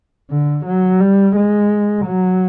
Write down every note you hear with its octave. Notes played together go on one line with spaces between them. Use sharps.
D3
F#3
G3
G#3
F#3